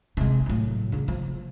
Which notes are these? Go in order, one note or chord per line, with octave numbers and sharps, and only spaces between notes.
C3 G#3
A2 F#3
C#3 D4
F3